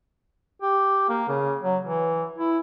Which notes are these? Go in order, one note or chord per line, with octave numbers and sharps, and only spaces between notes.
G4
A#3
C#3
F#3
E3
E4